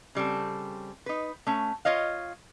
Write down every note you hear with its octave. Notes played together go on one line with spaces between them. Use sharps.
C#3 G3 C4 A4
D#4 B4
A3 C#4
F4 C#5 D#5 F5